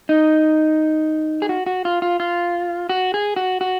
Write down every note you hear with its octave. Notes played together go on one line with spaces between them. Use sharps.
D#4
G#4
F#4
F#4
F4
F4
F4
F#4
G#4
F#4
F#4